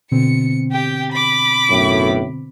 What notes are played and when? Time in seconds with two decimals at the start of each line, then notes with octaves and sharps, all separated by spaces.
0.12 B2 D3 C4 C#7
0.72 G4 G5
1.12 B5 D6
1.70 B1 F#2 A2